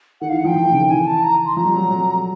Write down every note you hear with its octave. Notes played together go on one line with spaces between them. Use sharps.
D#3 F#5
F5
E3
F#5
F3 G5
F3
D#3
C#3
D#3
E3 G#5
A5
A#5
C6
F3 A#5
G3
F#3
F#3